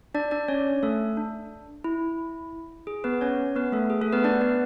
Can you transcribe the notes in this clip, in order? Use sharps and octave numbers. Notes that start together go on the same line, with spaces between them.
D4 D5
D4 D5
C#4 C#5
A3 A4
D4
E4
G#4
B3 B4
C#4 C#5
B3 B4
A3 A4
G#4
A3 A4
B3 B4
D4 D5
B3 B4